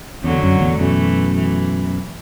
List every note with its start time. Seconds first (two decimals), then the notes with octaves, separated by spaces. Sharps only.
0.24 E2 D3 F#3
0.43 F#2
0.61 E2 A2
0.80 F#2 B2 E3 A3
1.35 E3